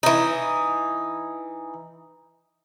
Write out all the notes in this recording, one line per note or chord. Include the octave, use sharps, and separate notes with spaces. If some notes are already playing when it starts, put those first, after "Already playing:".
E3 D#4